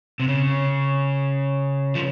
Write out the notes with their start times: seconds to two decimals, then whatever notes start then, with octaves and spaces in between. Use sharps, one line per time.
0.20 C3
0.28 C#3
1.95 F3